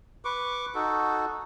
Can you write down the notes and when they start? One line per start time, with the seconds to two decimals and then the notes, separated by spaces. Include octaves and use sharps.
0.25 B4 C#6 D6
0.75 D#4 F#4 A4